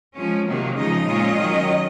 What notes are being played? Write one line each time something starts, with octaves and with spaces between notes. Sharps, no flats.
F3 G#3 C#4
C3 D#3 F#3 A#3
C#3 F3 G#3 D#4 D#5
A#2 G#3 C#4 F4
D#3 F#3 C#4